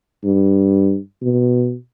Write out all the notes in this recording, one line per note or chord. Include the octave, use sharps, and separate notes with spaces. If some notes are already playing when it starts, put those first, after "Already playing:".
G2
B2